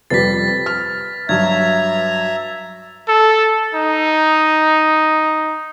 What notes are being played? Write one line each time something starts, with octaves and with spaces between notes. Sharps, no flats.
F2 C3 G3 B4 A6 B6 C7
F6
G2 F#3 E5 A#5 G#6
A4
D#4